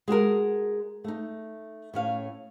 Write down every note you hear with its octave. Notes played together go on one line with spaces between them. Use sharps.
G#3 F#4 G#4 A#4
A3 D#4
A2 C#4 F5